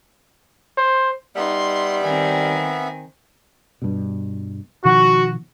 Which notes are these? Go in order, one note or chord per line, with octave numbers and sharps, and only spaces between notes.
C5
G3 B3 D#4 E5 C6
D#3 C4 G#5
G2 B2
B2 D#3 F3 F#4